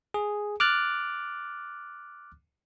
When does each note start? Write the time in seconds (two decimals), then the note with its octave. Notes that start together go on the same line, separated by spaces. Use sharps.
0.14 G#4
0.60 D6 F6 F#6 A6